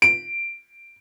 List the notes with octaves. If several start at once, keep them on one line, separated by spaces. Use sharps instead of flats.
D7